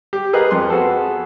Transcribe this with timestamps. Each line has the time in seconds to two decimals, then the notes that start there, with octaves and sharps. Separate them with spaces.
0.13 G4
0.33 G#4 A#4 B4 D#5 F5
0.51 F2 C6
0.70 B3 F#4 G#4 A4